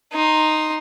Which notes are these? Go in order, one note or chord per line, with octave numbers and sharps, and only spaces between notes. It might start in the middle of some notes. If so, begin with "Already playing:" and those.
D#4 C6